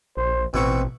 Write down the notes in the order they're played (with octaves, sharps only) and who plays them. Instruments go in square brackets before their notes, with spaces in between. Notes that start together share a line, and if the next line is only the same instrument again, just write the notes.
[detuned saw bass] A#1 [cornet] C5
[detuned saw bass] A1 [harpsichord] B2 E4 C#6 [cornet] C4